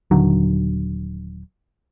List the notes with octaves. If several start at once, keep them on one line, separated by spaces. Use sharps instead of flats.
D#1 D3 D#3 F#3